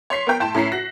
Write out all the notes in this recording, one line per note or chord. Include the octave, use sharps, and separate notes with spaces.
C#5 C6 B6 C7
B3 A#4 G5
A2 G5 A5 C6 E7
A2 C#4 A#5 B6 C7
F#4 F#6 A#6